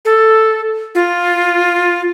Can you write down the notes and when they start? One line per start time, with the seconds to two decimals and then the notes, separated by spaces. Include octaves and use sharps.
0.05 A4
0.95 F4